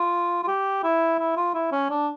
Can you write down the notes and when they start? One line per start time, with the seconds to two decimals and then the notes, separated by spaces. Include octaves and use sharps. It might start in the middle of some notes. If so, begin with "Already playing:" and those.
Already playing: F4
0.43 F4
0.48 G4
0.83 E4
1.19 E4
1.37 F4
1.54 E4
1.72 C#4
1.90 D4